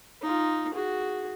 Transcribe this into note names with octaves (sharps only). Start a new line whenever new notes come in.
D#4 F4
F#4 G#4